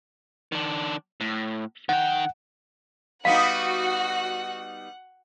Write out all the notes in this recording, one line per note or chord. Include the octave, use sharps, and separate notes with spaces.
D#3 D4
A2
D#3 F#5 G5
G3 B3 D#4 F#4 F5 F#5